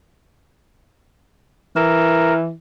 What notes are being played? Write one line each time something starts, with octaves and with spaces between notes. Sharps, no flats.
E3 A#4